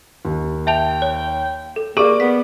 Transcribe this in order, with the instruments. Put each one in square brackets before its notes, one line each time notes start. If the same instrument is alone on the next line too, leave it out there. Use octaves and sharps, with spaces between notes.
[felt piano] D#2
[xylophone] E5 A5 F7 [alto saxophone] G5
[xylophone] C#5
A4
[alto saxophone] A#3 [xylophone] G4 G#4 C#6 [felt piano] D5 D6
[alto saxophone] B3 [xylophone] B6